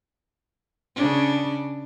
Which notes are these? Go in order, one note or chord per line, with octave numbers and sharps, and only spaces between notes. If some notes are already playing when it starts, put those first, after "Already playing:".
C#3 D4